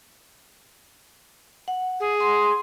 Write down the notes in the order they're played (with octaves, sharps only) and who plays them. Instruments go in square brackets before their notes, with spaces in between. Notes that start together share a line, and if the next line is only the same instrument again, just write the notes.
[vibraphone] F#5
[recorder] G#4
[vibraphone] C6